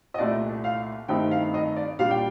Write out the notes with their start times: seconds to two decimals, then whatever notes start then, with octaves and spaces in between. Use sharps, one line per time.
0.14 D#5
0.18 C2 A#2 A3 D5
0.64 F5
1.08 G2 D#3 A3 C4 D#4 G5
1.31 F5
1.54 D#5
1.76 D5
1.99 A#2 G3 D4 F5
2.11 G5